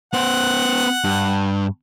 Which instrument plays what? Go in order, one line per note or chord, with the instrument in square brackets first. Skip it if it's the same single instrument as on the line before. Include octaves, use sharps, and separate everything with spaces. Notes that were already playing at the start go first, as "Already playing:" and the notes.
[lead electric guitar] B3 C5 [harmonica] F#5
[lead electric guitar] G2